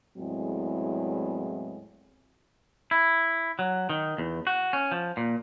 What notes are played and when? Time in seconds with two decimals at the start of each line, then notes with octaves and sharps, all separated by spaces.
0.18 E2 A2 F#3 G#3 C4
2.91 E4
3.59 F#3
3.89 D#3
4.18 E2
4.47 F#4
4.73 C#4
4.92 F3
5.17 A#2